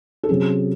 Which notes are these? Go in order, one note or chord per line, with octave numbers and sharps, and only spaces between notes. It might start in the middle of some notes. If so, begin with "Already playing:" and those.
A4
C3 F#3 C#4 G#4